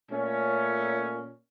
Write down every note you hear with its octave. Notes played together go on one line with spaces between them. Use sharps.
A#2 A3 C#4